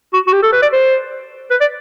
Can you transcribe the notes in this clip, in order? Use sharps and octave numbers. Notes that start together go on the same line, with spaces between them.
F#4
F#4
G4
A4
B4
D5
C5
B4
D5